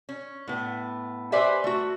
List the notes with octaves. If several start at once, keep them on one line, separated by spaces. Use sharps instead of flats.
C#4
A2 B3
G4 B4 C5 D5 E5 G#5
A3 F#4